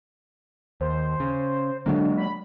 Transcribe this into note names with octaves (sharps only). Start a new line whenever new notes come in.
D#2 C5
C#3
D3 F#3 G#3 A#3
B5